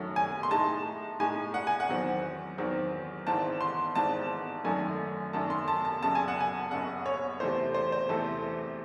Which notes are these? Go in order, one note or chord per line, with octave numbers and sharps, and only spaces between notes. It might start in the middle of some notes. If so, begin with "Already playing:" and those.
Already playing: F#2 D#3 F#3 A3 C#4
G#5
C6
A2 G#3 D#4 A5
A2 G#3 D#4 G#5
F#5
G#5
F#5
E2 D#3 F#3 C4
E2 D#3 F#3 C4
G#1 G#2 E3 C4 A5
C6
G#1 G#2 E3 C4 A5
G#1 F#2 D#3 F#3 A3 G#5
G#1 F#2 D#3 F#3 A3 A5
C6
A5
A5
F#1 F#2 C#3 A5
G#5
F#5
G#5
F#1 F#2 C#3 F#5
C#5
E2 C3 E3 A3 C5
C5
C5
E2 C3 E3 A3 A4